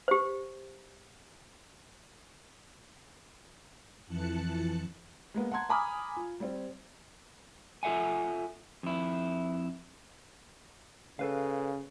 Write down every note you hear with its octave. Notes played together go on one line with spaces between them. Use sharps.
G4 C5
F2 E3 A5 F#6 C#7
G#3 A#3 B3
F#5 A5 A#5 C6 G#6
G#5 A#5 B5 D6 D#6 F6
F4
G3 C4
F4 A4 E5 F#5 G#5
F2 E4
C#3 A4 B4 F5